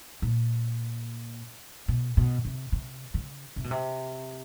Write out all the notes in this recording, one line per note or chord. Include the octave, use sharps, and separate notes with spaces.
A#2
B2
B2
C3
C3
C#3
C3
B2
C3